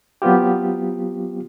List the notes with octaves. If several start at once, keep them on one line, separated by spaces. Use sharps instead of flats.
F#3 B3 C4 F4 G4